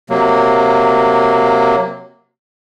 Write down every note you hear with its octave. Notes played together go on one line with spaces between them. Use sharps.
C3 F#3 A#3